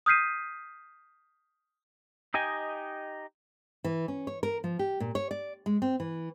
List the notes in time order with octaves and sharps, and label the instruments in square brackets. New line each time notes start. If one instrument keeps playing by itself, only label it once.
[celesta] D#6 F6 G6 B6 C7 D#7
[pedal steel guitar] D#4 G4 D#5 G5 G#5
[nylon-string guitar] E3
C#4
C#5
A#4
F3
G4
A#2
C#5
D5
G#3
C4
E3